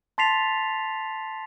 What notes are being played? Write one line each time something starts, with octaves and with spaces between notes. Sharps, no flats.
A5 C6 A6 B6 C7 F7